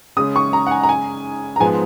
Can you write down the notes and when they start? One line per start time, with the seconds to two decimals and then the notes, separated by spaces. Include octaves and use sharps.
0.17 C#3 G#3 C#4 D#6
0.36 C#6
0.53 A#5
0.67 F#5
0.71 G#5
0.83 A#5
0.89 G#5
1.56 A#5
1.60 G#2 F3 G#3 B3 G#5